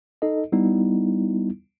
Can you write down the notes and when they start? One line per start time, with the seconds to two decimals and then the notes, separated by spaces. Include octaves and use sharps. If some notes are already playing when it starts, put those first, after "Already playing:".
0.22 D#4 A4 D#5
0.52 G3 B3 D#4 E4